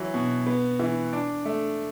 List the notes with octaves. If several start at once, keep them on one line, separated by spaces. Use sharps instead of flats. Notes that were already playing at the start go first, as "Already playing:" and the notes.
Already playing: E3 F#3
B2
B3
E3
D4
A3